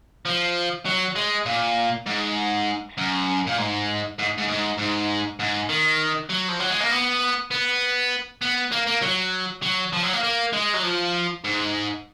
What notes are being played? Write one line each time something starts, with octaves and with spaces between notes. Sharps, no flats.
F3
F#3
G#3
A#2
G#2
F#2
A#2
G#2
G#2
G#2
G#2
G#2
G#2
D#3
F#3
F3
F#3
G#3
A#3
B3
B3
B3
A#3
A#3
F#3
F#3
F3
F#3
A#3
A#3
G#3
F#3
F3
G#2